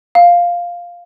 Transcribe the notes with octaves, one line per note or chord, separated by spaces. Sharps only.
F5